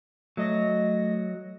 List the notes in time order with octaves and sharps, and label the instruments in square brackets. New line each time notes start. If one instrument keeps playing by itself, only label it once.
[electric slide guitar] F#3 [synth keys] A3 D#5 A#6